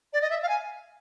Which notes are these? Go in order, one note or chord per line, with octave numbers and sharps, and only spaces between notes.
D5
D#5
E5
F5
G#5